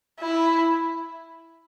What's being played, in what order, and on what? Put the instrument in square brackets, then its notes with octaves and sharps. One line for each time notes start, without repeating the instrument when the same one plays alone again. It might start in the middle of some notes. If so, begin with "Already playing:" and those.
[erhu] E4